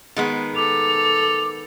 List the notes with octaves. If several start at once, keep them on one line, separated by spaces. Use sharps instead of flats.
D#3 G#3 B3
A4 D6 F7